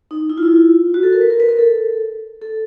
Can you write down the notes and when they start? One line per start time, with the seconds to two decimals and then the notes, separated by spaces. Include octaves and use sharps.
0.11 D#4
0.30 E4
0.38 F4
0.43 E4
0.48 F4
0.94 F#4
1.03 A4
1.12 A#4
1.21 B4
1.30 A#4
1.40 B4
1.49 A#4
1.59 A4
2.42 A4